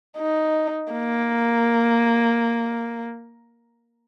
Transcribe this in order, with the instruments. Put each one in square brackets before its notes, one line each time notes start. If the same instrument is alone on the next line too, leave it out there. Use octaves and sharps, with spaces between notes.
[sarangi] D#4
A#3